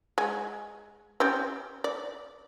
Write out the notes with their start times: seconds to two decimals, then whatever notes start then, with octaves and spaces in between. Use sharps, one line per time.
0.18 G#3 G#5
1.20 C4 C#4 G4
1.84 D5